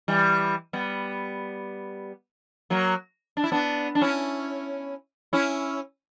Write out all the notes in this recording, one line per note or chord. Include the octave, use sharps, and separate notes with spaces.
E3 G3
G3 B3
F#3 A#3
D4
E4
B3 D4
D4
C#4 E4
C#4 E4